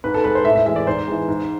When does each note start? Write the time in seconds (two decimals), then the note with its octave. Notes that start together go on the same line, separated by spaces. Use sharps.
0.04 G#2 B4
0.14 A4
0.24 G#3 B4
0.35 C5
0.45 A2 E5
0.56 E5
0.66 E3 G#3 E5
0.76 D5
0.86 G#2 C5
1.07 E3 G#3
1.28 G#2